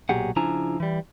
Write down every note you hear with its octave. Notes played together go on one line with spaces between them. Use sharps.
B1 A#2 F#3 G4 G#4 F#5
C#3 F3 D4 E4 G#5 A#5
E3 G3